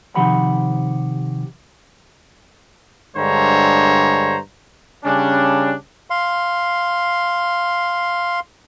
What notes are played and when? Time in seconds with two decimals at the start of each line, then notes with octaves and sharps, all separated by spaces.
0.15 C3 D#3 F3 G4 F#5 B5
3.17 G2 D3 G#3 C5 C#5 A#5
5.05 C#3 G3 C#4 D4
6.10 F5 C6